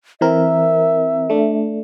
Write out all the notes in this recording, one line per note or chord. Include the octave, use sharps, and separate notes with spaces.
E3 C4 A#4 E5
A3 D4